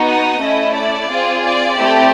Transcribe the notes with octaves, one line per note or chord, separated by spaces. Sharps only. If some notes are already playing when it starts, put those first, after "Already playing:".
Already playing: B3 D#4 F#4
D#5
A3 C#4 E4
D5
C4 F4 G#4
D5
A3 C4 E4 G4